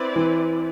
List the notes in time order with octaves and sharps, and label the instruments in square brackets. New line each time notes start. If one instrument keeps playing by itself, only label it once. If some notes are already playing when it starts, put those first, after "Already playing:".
Already playing: [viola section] C4 E4 B4 D5
[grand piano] E3